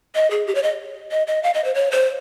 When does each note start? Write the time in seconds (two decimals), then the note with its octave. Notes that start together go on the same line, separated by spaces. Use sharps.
0.15 D#5
0.31 G#4
0.47 G4
0.55 C#5
0.63 D#5
1.11 D#5
1.27 D#5
1.43 F5
1.54 D#5
1.64 C5
1.75 C#5
1.92 C5